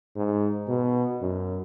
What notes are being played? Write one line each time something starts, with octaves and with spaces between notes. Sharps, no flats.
G#2
B2
F#2